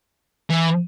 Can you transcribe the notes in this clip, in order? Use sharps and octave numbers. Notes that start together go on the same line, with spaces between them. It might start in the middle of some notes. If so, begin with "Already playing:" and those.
E3